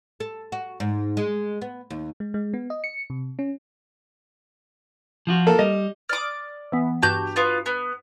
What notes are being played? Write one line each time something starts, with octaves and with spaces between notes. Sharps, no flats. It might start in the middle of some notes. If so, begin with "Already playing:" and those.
A4
F#4
G#2
G#3
B3
D#2
G#3
G#3
B3
D#5
C#7
C3
C#4
F3 F4 F#4
A#3 A4
G3 D#5
D5 D6 D#6 F6
E3 B3
G2 F#4 G4 A5 G6
B3 F4
B3